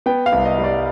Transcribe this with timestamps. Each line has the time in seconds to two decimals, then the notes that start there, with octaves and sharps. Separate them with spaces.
0.06 B3 G5
0.26 F5
0.33 C2
0.45 D#5
0.58 G3
0.64 D5